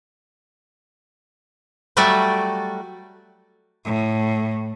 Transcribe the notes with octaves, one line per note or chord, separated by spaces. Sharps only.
F#3 G3 A3 F#4 D5 E5
A2